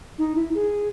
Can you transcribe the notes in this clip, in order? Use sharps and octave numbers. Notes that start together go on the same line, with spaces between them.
D#4
E4
G#4